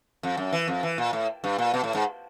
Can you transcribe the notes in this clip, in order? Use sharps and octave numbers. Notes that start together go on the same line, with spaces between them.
F2
F#2
E3
F2
E3
A#2
A2
G2
A#2
B2
A2
G#2